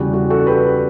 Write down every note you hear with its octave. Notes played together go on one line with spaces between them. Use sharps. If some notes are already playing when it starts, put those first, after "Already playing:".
Already playing: E2 C#3 G3 F#4
F#4
F#4 A4
G4 B4